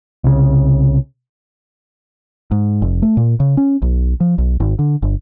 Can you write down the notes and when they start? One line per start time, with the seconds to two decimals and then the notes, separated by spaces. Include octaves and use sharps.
0.24 C2 C#3
2.51 G#2
2.82 F1
3.02 A3
3.17 A#2
3.40 C#3
3.57 C#4
3.82 B1
4.20 F3
4.38 B1
4.60 G#1
4.79 D3
5.02 G1